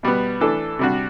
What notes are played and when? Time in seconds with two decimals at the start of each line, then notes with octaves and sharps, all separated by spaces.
0.03 B2 G3 B3
0.41 E3 A3 D4 A4
0.79 C3 G3 D4 F#4